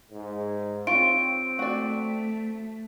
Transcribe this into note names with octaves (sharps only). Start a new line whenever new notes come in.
G#2
C4 F4 C#5 D7
A3 F#4 D5